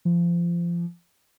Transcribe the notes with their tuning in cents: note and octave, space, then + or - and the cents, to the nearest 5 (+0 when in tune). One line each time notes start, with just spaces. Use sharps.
F3 -25